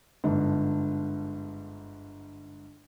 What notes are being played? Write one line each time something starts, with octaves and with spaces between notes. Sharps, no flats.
G1 G#2 D3